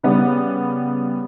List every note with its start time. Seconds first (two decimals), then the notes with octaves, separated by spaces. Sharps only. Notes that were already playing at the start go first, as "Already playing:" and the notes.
0.03 C#3 G3 B3